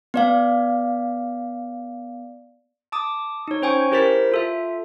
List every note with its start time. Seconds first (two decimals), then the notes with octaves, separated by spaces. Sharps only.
0.14 B3 D5 F5
2.92 A5 D6 D#6
3.48 D#4 C#5
3.62 C#4 C5 G5 G#5 C#6
3.92 E4 G4 A#4 C5 A6 B6
4.31 F4 A4 E5